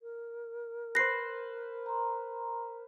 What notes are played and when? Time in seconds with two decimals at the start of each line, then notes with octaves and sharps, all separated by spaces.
0.01 A#4
0.95 B4 C5 A#6 C7
1.86 A#5 C6